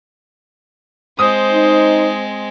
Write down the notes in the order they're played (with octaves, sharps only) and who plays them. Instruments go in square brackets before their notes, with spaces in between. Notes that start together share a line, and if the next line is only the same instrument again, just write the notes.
[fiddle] G#3 C4 [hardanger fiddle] C5 [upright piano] D#6
[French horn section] D#4